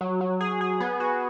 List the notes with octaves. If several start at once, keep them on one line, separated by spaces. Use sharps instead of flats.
F#3
F#3
G#4
G#4
B3
F#4